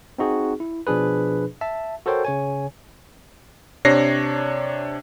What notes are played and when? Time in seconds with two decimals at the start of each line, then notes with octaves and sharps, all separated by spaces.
0.18 C4 D#4 F#4 G#4
0.60 E4
0.87 B2 F3 D4 G#4 B4
1.61 E5 A5
2.06 F#4 A4 A#4 C5 C#5 G5
2.25 C#3 C#5 G#5
3.85 C3 D4 C#5 A#6 C7